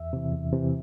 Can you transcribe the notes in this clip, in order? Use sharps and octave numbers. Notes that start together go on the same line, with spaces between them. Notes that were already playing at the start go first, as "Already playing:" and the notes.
Already playing: E2 E5
C3 E3
E2
C3 E3